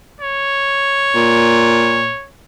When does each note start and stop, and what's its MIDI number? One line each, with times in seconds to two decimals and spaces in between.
0.20 2.28 73
1.15 2.14 46